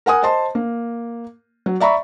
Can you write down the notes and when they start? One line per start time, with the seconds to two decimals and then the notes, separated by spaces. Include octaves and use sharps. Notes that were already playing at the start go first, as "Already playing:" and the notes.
0.06 A#4 F#5 G#5 D#6
0.23 C5 D#5 A5 C6
0.55 A#3
1.66 F#3
1.80 D5 E5 A#5 B5 C#6